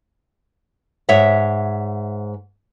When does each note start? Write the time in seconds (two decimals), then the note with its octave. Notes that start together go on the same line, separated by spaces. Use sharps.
1.09 G#2 C#5 E5 F#5